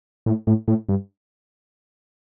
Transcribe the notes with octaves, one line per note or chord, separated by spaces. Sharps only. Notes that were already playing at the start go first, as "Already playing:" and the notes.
A2
A2
A2
G2